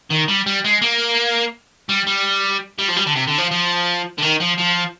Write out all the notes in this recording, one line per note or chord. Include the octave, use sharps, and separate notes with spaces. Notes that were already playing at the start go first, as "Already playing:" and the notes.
D#3
G3
G3
G#3
A#3
G3
G3
G3
F3
G3
D3
C3
D3
F3
F3
D3
D#3
F3
F3